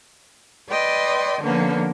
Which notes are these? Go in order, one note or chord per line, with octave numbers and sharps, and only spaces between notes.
B4 D5 D#5 G5 C6
D3 F3 A#3 B3 C#4